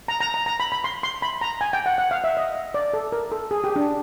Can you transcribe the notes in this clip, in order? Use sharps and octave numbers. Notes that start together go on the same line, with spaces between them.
A#5
A#5
A#5
A#5
B5
B5
C6
C6
B5
A#5
G#5
G5
F#5
F#5
F5
E5
D#5
D5
A4
A#4
A4
G#4
G4
D4